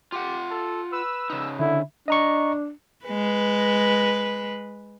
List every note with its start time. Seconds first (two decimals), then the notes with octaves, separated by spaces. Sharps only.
0.12 F4 G4 F#5
0.51 A4
0.92 B4 E6
1.30 C#3 D#4
1.59 D3 E4
2.08 D4 D#5 A#5 C#6
3.06 G#3 B4